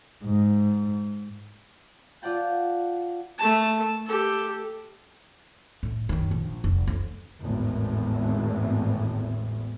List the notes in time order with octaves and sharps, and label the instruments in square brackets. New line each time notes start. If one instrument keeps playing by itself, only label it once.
[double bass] G#2
[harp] F4 D5 F#5 G5 A5
[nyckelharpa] A3 A5
G4 A4
[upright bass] A2
F#2 D#3
A#1
F1
F2
[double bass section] G#1 E2 A2